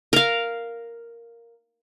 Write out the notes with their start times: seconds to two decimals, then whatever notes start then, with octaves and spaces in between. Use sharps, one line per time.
0.13 A#4 F5